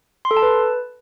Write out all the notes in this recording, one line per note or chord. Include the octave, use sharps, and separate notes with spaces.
C6
A4
A5
B4